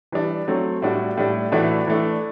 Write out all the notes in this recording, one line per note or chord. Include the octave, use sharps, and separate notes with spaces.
E3 G3 D4
F#3 A3 C4
A2 G3 D4 F#4
A2 G3 D4
A2 E3 A3 D4 F#4
E3 A3 D4